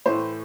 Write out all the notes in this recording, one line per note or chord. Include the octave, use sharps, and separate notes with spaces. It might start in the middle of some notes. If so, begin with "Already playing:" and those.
A2 E3 A3 C5